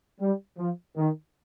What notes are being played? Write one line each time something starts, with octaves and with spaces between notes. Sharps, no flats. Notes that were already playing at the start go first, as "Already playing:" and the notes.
G3
F3
D#3